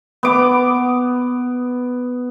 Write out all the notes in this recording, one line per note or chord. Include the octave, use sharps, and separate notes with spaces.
B3 D6